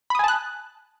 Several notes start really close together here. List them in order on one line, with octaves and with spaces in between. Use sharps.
B5 D#6 G#5 A5 F#6